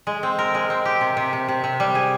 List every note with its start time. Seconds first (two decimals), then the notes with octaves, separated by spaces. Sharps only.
0.07 G#3
0.23 C4
0.39 A#4
0.55 G#3
0.70 C4
0.85 G4
1.01 C3
1.17 C3
1.33 C3
1.48 C3
1.64 C3
1.80 G3
1.95 G#4